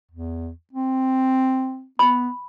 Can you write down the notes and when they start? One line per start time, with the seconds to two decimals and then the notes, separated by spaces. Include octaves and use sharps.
0.11 E2
0.73 C4
1.99 B3 B5